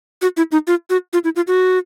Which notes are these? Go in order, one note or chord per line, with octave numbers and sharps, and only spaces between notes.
F#4
E4
D#4
F4
F#4
F4
E4
F4
F#4